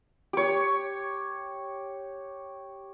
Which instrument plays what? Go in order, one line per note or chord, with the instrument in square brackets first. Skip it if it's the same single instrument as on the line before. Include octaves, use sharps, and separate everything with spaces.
[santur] G4 C#5